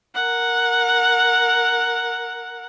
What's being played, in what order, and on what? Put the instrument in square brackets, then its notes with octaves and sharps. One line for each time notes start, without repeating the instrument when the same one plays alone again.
[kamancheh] A#4 F#5